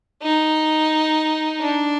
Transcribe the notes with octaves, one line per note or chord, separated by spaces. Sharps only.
D#4
D4